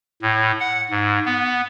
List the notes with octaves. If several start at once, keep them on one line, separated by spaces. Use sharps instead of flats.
A2
F#5
G#2
B3